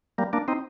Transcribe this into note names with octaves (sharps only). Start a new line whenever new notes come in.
G3 A#3
A#3 D4
C4 D#4